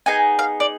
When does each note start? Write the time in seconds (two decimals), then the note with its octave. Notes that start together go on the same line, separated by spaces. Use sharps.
0.06 B3 D#4 G#4 G#5
0.39 F5
0.60 D5